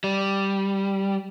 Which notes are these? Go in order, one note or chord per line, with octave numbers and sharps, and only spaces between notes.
G3